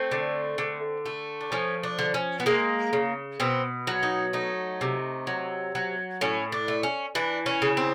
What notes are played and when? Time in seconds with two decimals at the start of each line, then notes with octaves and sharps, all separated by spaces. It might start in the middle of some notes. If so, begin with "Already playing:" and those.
Already playing: A3 C4
0.11 D3
0.58 D3
1.06 A3
1.41 D4
1.52 F3 C#4
1.83 D4
1.99 D3
2.14 C#4
2.40 B3
2.46 G#3 A#3
2.93 C#3
3.40 B2 C4
3.87 F#3
4.03 D#4
4.33 A3 D#4
4.81 C3
5.27 F#3
5.75 F#3
6.21 A2 C#4
6.52 D4
6.68 A3
6.83 C#4
7.15 E3 D4
7.46 C#4
7.62 C#3
7.77 C4